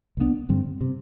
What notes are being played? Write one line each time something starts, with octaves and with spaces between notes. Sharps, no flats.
C2 B2 B3 D4
G2 D3 G3 C4
C3